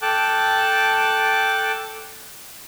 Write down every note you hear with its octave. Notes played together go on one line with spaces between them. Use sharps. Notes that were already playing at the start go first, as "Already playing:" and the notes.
A4 G5 A5 D6 F#6